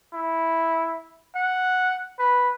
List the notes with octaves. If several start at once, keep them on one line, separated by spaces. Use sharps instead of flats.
E4
F#5
B4